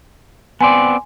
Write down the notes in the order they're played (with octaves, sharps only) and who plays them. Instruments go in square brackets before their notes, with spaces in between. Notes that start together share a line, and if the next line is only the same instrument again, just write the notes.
[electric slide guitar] B3 C4 D5 [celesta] G#5 C6